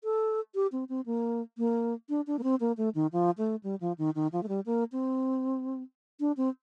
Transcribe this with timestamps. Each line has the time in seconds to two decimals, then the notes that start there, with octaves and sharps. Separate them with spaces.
0.04 A4
0.55 G4
0.72 C4
0.89 C4
1.06 A#3
1.58 A#3
2.09 D4
2.27 D4
2.39 A#3
2.43 C4
2.60 A#3
2.77 A3
2.95 D#3
3.13 F3
3.38 A3
3.63 G3
3.81 F3
3.98 D#3
4.15 D#3
4.32 F3
4.43 A3
4.48 G3
4.66 A#3
4.92 C4
6.20 D4
6.37 C4